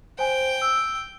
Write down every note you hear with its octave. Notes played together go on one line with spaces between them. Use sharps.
C5 G5 G#5
E6